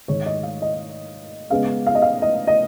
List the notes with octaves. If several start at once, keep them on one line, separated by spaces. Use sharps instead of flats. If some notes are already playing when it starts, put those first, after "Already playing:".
G#2 D#3 G#3 C#5
D#5
F5
D#5
C#3 G#3 B3 F5
F5
D#5
F5
D#5
D#5